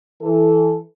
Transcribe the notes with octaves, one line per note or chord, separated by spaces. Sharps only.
E3 A4